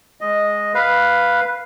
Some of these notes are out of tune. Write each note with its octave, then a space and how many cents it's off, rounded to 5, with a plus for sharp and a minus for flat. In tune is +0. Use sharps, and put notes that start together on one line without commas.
G#3 +0 D#5 +0
B4 +0 F5 +0